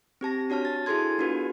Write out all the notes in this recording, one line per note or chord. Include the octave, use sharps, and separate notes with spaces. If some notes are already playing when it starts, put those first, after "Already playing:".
C4 G4 A5 A#6
D4 F#4 C#5 A5 F6
A6
E4 F#4 G#4 A4 C6 G#6
B3 D4 F4 F#4 B4